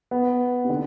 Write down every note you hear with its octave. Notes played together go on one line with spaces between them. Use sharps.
B3
C3
D3